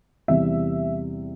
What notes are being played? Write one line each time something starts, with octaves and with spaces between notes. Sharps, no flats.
E2 C3 E3 G3 E5